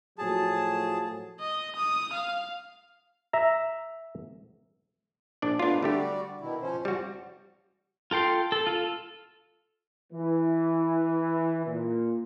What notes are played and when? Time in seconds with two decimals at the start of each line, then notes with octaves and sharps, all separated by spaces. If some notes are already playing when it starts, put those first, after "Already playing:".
0.18 A2 F3 F#3 G#4 A5
1.40 D#5
1.76 D#6
2.13 F5
3.33 E5 A#5
5.42 A#1 D4 D5
5.59 G#2 A3 B3 D4 F4
5.83 D3 G3 A3 F#4 G4 D5
6.41 B2 D#3 E4
6.62 F3 C#4 C5
6.85 F2 C#3 G3 F#4
8.11 F4 A4 G5 C6
8.52 A4
8.67 F4 A4
10.13 E3
11.66 A#2